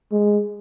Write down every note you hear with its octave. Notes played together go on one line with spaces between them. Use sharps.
G#3